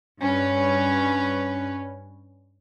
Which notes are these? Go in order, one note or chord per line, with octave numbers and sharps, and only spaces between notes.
G2 C#4 B4